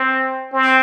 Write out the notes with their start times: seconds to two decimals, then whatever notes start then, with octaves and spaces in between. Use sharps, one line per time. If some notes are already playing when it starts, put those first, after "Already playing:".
Already playing: C4
0.53 C4